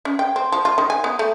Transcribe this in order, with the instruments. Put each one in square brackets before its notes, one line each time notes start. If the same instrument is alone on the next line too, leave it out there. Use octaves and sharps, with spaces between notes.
[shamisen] C#4
G5
C4
F3
F4
D#3
G#5
B3
A3